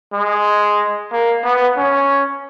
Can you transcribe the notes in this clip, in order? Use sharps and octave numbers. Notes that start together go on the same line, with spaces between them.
G#3
A#3
B3
C#4